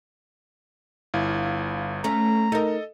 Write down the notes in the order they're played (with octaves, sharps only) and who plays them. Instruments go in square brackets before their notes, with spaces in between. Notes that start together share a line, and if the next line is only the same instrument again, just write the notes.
[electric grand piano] G1 E4 F5
[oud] A3 C#4 [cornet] A#5
[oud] D#4 A#4 [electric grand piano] A4 D#5